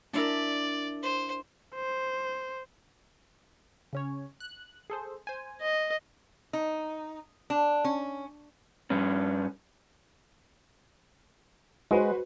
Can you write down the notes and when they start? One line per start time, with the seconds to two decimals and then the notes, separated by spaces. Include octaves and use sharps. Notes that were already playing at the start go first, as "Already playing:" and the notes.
0.13 D4 E4 A#4 D5
1.03 C5
1.75 C5
3.93 C#3 C#4 C#5
4.40 F#6
4.90 G#4 A4 C5
5.27 C5 G#5
5.61 D#5
6.53 D#4
7.50 D4
7.84 C#4
8.90 G2 C#4
11.91 G#3 F#4 B4 C5